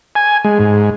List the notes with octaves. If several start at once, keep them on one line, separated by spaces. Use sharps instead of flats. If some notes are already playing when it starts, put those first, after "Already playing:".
G#5
G#3
G#2